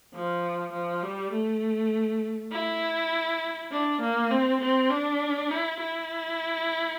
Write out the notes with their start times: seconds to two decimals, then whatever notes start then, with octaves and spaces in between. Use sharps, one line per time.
0.14 F3
0.73 F3
1.03 G3
1.33 A3
2.52 E4
3.71 D4
4.01 A#3
4.31 C4
4.61 C4
4.91 D4
5.50 E4
5.80 E4